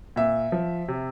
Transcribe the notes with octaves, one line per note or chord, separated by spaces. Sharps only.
A#2 E5
F3
C3